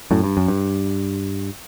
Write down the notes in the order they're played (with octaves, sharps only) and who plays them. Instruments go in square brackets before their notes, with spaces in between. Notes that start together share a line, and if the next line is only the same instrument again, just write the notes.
[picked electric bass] F#2 A2
G2
F#2
G2